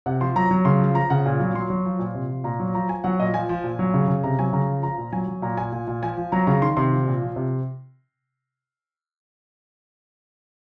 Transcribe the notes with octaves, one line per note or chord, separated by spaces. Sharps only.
C3 F#5
F3 C6
F#3 A#5
F#3
C#3 C6
F3
F3 A#5
C#3 F#5
A#2
F#3
F#3 C6
F#3
F3
A#2
C3
F3
A#2 A#5
F#3
F3 A#5
F3 G#5
F#3 F#5
A#2 D#5
F3 G#5
F3
A#2
F#3
C#3
C#3
C3 A#5
F#3 G#5
C#3 A#5
F3
F3 A#5
A#2
F#3 G#5
F#3
A#2 A#5
A#2 G#5
A#2
A#2
F3 G#5
F3
F#3 A#5
C#3 A#5
D#3 C6
C3 C6
F3
A#2
F3
C3